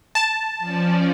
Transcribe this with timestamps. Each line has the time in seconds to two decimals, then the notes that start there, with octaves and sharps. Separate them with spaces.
0.15 A5
0.59 F3 C#4 D5